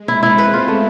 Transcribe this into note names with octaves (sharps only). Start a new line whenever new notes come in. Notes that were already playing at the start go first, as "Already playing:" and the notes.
Already playing: G#3
E4
C4 E4
B4
B3 F4
A3